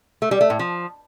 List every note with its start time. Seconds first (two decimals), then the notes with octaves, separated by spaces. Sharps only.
0.22 A3
0.31 G3
0.41 A3
0.50 A2
0.59 F3